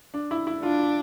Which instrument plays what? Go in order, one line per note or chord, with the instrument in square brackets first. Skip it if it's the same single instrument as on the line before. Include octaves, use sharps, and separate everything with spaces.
[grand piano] D4
E4
E4
[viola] D4 [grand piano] F4
[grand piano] F4